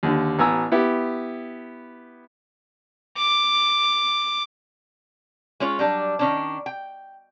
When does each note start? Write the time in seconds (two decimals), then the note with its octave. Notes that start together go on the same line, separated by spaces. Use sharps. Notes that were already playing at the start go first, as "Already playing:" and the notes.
0.03 D#2 D3
0.39 A1 B3 G#5 A#5 E6
0.72 B3 E4 G4
3.17 D6
5.60 G#3 C#4 F4 C#5
5.79 F#3 G3 D4
6.19 D#3 C#4 D4
6.66 G5